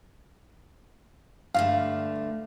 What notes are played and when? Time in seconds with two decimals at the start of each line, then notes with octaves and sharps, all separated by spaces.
1.54 G2 D3 A3 F5